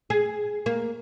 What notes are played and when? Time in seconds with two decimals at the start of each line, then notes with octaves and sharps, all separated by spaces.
0.10 G#4
0.66 A#3